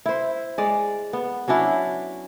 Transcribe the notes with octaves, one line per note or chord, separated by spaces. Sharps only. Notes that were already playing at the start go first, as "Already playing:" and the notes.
E4 C5
G#3 D5
B3
F#3 C#4 D4 E4